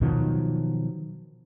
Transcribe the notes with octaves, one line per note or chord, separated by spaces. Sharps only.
B2 D#3 F3 F#3